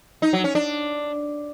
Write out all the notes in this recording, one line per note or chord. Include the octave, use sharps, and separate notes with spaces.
D#4
F#3
C#4
D4